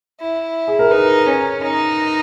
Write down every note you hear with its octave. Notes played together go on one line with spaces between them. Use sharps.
E4
G#4
A#4
D#4 B4
C#4
D#4